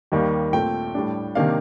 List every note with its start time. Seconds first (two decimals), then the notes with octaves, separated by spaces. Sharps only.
0.12 D#2 D#3 G3 A#3
0.53 A#2 A3 C4 G5
0.94 A2 G3 D4
1.35 C3 D#3 A#3 D4 F5